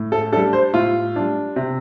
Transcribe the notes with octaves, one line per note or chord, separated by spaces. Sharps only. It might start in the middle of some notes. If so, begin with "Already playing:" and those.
Already playing: A2
A4
G3 D4 A4
C5
A2 F4
G3 D4
C3